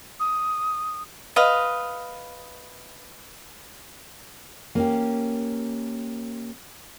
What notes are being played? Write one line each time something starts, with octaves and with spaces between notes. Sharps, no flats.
D#6
B4 D#5 F5
A#3 C#4 G4